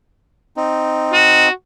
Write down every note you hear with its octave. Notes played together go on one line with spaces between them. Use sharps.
C4 D#4
F#4